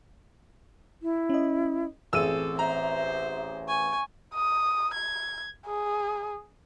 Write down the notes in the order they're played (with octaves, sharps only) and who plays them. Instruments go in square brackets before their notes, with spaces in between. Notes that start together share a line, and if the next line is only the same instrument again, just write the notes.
[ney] E4
[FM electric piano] C#4 D#5
[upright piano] A1 G#4 D#7 [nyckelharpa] C4 A4 [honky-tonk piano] E6
[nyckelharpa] C5 [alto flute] E5 [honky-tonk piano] A#5
[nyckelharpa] G#5 [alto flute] C#6
[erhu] D#6
G#6
G#4